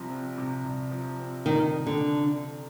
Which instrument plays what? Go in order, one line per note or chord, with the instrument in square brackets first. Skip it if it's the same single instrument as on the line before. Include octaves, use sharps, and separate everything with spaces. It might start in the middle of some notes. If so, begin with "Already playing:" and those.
Already playing: [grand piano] C2 C3 F3
C4
C3
C2
F3
C4
[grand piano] C3 [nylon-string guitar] D#3
[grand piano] C2
[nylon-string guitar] D3